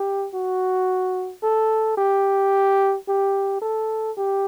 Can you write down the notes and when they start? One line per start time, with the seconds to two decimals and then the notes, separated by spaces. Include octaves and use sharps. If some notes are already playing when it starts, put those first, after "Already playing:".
Already playing: G4
0.34 F#4
1.43 A4
1.97 G4
3.08 G4
3.62 A4
4.17 G4